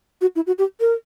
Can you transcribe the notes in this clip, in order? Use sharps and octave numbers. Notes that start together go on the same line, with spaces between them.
F#4
E4
F#4
G4
A#4